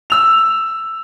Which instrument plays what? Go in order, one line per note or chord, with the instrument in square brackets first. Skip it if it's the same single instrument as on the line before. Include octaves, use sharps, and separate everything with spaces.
[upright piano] E6 F7